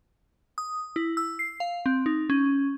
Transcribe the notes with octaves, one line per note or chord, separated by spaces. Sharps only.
D#6
E4
E6
C7
F5
C4
D#4
C#4